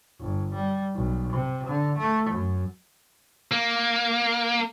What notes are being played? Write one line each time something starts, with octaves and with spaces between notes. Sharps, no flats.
G1
G3
B1
C3
D3
A3
F#2
A#3